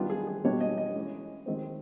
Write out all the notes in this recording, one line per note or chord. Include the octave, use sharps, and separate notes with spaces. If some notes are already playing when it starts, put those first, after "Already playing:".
Already playing: D#3 G3 B3 D4 F4
G#4
G#4
B2 G3 A#3 D4 C#5
D#5
D#5
E3 G#3 C#4
D#3 G#3 C4